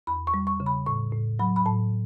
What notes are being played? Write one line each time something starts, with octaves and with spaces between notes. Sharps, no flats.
E2 B5
C#6
G3
C#6
C#3
B5
A2 C#6
A2
F#3 B5
B5
A2 A5